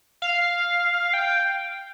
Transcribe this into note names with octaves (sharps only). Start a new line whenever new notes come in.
F5
G5